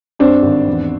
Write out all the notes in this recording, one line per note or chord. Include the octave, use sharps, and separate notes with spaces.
G2 C4 D4
G#1
E2